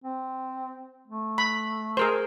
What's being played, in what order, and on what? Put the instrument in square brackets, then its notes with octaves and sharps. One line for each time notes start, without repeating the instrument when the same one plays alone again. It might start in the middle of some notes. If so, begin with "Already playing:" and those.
[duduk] C4
A3
[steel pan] B5
G#4 A#4 C5